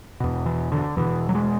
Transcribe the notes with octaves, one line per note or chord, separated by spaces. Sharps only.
E2 B2
E3
D3
E2 B2 E3
F#3
G#3